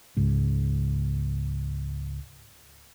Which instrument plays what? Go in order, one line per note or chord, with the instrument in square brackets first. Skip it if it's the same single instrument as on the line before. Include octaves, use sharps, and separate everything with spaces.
[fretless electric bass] C#2 G#2